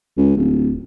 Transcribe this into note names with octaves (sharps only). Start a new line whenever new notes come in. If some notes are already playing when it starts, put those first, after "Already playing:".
C#2
D1